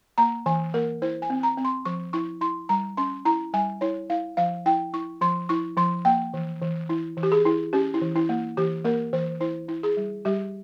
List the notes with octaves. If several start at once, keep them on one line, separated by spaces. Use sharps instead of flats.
A#3 A#5
E3 G#5
A#3 A#4
E4 C5
G#5
C4
A#5
C4
C6
F3 C#6
E4 C#6
E4 C6
G3 A#5
C#4 C6
E4 A#5
G3 G#5
E4 C#5
E4 F5
F3 F5
E4 G5
E4 C#6
F3 C6
E4 C#6
F3 C6
A#3 G5
E3
E3
E4
E3
G4
G#4
E4
C#4 G4
E4
E3
E4
A#3
E3 G4
A#3 A#4
E3 C5
E4 C5
E4
G#4
G3
G3 G4